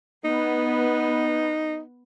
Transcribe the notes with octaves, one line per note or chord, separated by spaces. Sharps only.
B3 D#4